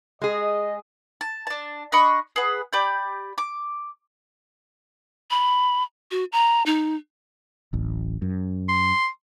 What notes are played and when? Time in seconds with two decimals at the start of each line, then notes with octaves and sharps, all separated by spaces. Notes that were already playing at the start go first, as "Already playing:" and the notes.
0.22 G#3 G#4 D#5
1.21 A5
1.47 D4 A5
1.92 D4 D#5 B5 C#6
2.36 G#4 B4 F#5
2.73 G4 D5 B5 G6
3.38 D6
5.31 B5
6.11 F#4
6.32 A#5
6.66 D#4
7.73 D1 A1
8.22 F#2
8.68 C6